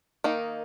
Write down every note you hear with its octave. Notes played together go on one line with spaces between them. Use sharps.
D#3 A#3 D#4